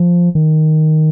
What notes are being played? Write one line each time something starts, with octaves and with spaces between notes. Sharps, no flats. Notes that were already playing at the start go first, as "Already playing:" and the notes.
Already playing: F3
D#3